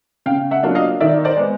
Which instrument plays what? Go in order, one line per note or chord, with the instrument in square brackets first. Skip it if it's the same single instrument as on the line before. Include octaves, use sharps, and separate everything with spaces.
[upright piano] C#3 F5 G5
E5 F#5
F#3 A#3 D4 F4
D#5 F5
D#3 D5 E5
C5 D5
G#3 B3